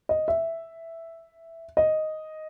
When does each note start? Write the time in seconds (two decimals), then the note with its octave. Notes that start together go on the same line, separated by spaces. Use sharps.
0.09 D#5
0.28 E5
1.77 D#5